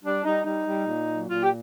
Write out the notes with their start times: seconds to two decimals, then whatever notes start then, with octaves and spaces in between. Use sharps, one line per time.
0.03 G3 D4
0.24 G3 D#4
0.45 G3 D#4
0.66 G3
0.87 A#2
1.08 F#3
1.29 A#2 F4
1.43 G4